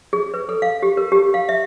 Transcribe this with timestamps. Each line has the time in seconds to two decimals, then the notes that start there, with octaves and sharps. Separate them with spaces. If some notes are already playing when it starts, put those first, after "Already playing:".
0.13 G#4
0.34 B4
0.49 A4
0.62 F5
0.83 G4
0.97 A#4
1.12 G4
1.34 F5
1.49 E5